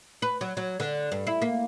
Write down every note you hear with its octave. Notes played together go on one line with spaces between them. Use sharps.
B4
F#3
F#3
D3
G2
E4
A#3